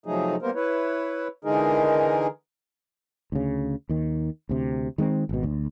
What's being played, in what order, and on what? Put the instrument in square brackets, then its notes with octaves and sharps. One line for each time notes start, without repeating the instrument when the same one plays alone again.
[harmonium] C3 F3 F#3 A3 D#4 G#4
G3 A#3 B3 A#4 C5
E4 B4 C#5
D3 E3 G#3 D#4 G#4 A#4
[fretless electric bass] D2 C#3
D#2 D#3
D2 C3
D#3 G#3 B3 C4
G#1 B2
D2